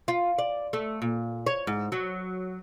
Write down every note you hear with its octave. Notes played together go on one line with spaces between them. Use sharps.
F4
D5
A3
A#2
C#5
G#2
F#3